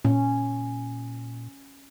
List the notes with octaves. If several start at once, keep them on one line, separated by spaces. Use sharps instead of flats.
A#2 C#4